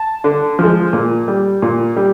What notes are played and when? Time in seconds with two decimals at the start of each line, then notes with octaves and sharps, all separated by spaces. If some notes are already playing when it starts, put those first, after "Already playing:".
Already playing: A5
0.24 D3
0.59 F3 G#3
0.93 A#2
1.28 G3
1.62 A#2
1.96 G3